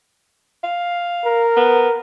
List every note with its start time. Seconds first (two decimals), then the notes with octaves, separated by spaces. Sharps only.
0.64 F5
1.25 A#4
1.57 B3